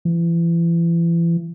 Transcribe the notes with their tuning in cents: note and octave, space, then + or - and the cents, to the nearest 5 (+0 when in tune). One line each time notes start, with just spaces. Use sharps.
E3 +35